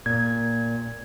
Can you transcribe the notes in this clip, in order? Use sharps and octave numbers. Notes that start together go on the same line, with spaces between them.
A#2 G#6